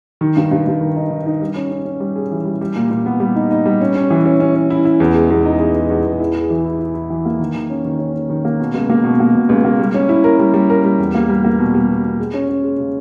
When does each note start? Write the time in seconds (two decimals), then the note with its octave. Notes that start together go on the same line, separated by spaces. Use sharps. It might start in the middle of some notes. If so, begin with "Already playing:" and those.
0.21 D#3
0.36 G2
0.51 G2
0.67 G2
0.81 D#3
0.96 D#4
1.11 D#3
1.26 D#4
1.41 G3
1.56 C#4
1.71 C#4
1.85 C#4
2.00 G3
2.16 G#4
2.31 E3
2.45 G3
2.61 G3
2.76 A#2
2.90 A#2
3.06 B3
3.20 G3
3.35 D#4
3.50 D#4
3.66 G3
3.81 C#4
3.95 C#4
4.10 E3
4.25 C#4
4.40 C#4
4.55 C#4
4.70 E4
4.85 E4
5.00 E2
5.15 G#3
5.30 E2
5.45 D#4
5.60 E2
5.76 G#3
5.90 E2
6.05 E2
6.20 E4
6.34 G#4
6.50 E3
6.65 E4
6.79 E4
6.94 E4
7.10 E3
7.25 A#3
7.40 D#3
7.55 D#3
7.70 C#4
7.85 D#3
7.99 C#4
8.14 C#4
8.29 D#3
8.45 A#3
8.60 B2
8.74 C#2
8.89 A#3
9.04 B2
9.20 A#3
9.35 B2
9.49 C#2
9.65 A#3
9.79 G3
9.94 C#4
10.09 E4
10.24 A#4
10.39 G3
10.54 G3
10.70 A#4
10.84 G3
10.99 E2
11.15 A#3
11.29 G3
11.44 A#3
11.59 B2
11.74 G3
11.89 B2
12.04 B2
12.19 G#3
12.34 C#4
12.49 C#4
12.64 G#3
12.79 C#3